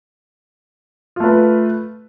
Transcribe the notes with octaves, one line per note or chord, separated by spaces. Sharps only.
A3 F4 B4